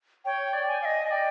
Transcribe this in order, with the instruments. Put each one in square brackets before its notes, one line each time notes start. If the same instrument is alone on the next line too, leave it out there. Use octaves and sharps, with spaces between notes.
[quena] C#5 [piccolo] G5
[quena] D5
[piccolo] G#5
[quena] F5
D#5
[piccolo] G#5
[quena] D5 [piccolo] G5